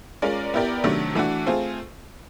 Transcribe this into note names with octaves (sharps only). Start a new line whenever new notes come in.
G#3 C#4 F4 A#4 D5
B3 E4 G4 A#4 D5
C3 D#3 F#3 A3 D4
E3 A3 D4 F#4
A3 C4 F4 G#4